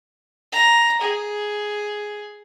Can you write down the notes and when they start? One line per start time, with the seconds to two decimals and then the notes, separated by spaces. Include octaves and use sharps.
0.52 A#5
1.01 G#4